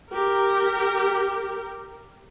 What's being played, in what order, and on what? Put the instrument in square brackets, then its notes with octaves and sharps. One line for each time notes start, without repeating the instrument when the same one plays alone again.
[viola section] G4 A#4